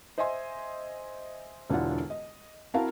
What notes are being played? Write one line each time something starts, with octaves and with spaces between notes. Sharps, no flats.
C5 D#5 E5 G#5 C6
E1 D3 E3 D4 F4 F#5
D#5
C4 E4 F#4 A#4 F5 A5